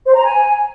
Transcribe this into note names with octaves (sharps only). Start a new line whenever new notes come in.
C5
A#5
G#5